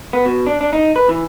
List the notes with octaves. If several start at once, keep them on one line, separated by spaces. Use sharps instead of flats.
B3
B2
D4
D4
D#4
B4
E3